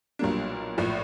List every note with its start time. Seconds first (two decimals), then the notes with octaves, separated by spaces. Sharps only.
0.19 B1 A#2 G3 A#3 D4
0.78 A#1 A2 F3